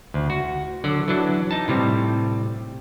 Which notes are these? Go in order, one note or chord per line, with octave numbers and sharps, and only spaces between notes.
D2
F#4
D3 F#3 D5
E3 F#3 D4
D#4 A5
A2 C3 G3